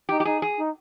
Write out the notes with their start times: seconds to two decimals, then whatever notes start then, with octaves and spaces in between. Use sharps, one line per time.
0.09 D#4 G4
0.20 G4
0.25 D#4 G#4
0.42 G#4
0.58 D#4